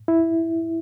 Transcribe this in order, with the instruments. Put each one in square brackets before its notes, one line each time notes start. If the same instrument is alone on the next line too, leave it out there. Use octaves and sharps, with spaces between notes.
[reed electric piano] E4